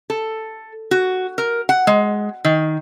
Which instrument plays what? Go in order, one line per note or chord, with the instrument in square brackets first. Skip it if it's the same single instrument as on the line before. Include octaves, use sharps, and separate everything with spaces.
[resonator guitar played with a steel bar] A4
F#4
A#4
F#5
G#3
D#3